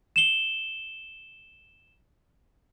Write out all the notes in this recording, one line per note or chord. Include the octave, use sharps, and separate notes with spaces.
E7 G7